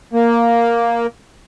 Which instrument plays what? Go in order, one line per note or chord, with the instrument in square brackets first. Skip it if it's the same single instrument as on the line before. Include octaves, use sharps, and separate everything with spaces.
[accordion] A#3